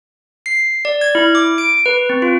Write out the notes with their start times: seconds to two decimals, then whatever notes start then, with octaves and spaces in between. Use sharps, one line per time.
0.46 C7
0.85 D5
1.01 G#6
1.15 E4
1.35 D6
1.58 D7
1.86 B4
2.10 C4
2.22 F4